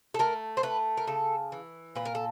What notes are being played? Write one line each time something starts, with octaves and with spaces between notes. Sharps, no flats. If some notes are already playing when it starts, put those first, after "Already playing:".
A4
A3 A#4
C5
A3 B4
A#4
C#3 A4
E3
A#2 B4
A#4
A4